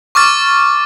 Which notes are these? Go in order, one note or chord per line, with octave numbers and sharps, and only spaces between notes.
C#6 D6 F6 A6